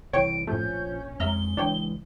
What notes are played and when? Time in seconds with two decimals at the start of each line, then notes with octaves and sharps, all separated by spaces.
0.13 C2 E3 C#5 G5 C#6 D7
0.47 A#1 A2 F3 A3 C#4 G6
1.20 F2 G#3 E5 A#5 F6 G7
1.57 C#2 E3 G#3 D4 C#5 G5